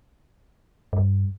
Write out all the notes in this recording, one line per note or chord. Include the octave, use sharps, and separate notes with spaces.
G2